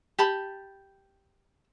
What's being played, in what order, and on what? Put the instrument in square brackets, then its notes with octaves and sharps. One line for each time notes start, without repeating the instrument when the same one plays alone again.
[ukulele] G4 A5 B5